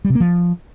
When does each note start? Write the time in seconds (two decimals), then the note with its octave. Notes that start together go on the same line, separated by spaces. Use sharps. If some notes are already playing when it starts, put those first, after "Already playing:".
0.05 G3
0.10 C3
0.15 A#3
0.20 F3